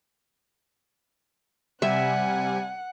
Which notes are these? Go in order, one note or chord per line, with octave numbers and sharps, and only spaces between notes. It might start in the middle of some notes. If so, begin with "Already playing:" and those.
C3 G3 E5 F#5 G#5